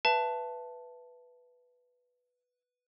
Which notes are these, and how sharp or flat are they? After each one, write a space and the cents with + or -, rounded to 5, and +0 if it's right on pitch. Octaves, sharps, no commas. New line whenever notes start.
B4 +0 E5 +25 A5 +0